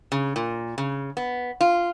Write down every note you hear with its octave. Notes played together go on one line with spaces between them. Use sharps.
C#3
A#2
C#3
B3
F4